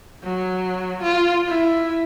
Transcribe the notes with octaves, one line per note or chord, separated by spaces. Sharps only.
F#3
F4
E4